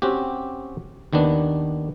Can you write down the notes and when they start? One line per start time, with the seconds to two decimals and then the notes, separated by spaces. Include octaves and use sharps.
0.02 C4 C#4 F#4 G4
1.13 D#2 D#3 B3 D4